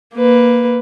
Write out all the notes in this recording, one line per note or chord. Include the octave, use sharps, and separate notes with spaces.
A#3 B4